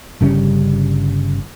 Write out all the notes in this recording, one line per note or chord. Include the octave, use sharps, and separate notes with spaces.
G1 C#3 G3 C#4